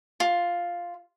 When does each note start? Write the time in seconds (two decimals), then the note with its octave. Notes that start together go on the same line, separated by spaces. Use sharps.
0.20 F4